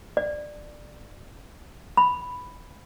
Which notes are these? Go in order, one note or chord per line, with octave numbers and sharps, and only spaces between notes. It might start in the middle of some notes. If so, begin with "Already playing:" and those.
D5
B5